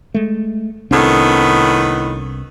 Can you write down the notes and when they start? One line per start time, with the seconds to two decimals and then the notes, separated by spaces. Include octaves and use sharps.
0.14 G#3 A3
0.91 C2 A2 D#3 B3 C4 D4